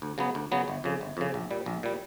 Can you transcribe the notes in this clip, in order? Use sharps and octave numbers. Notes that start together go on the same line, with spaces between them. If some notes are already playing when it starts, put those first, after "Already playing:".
D2
C#3 F#3 B3
D2
C#3 F#3 B3
G1
F2 C#3
G1
F2 C#3
A#1
A#2 G3
A#1
A#2 G3